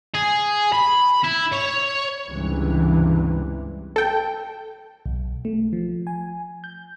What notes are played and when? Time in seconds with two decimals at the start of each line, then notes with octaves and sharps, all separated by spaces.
0.15 G#4
0.73 B5
1.24 E4
1.53 C#5
2.29 C#2 G2 C3 E3
3.96 A4 G5
5.06 B1
5.45 A3
5.73 F3
6.07 G#5
6.64 G6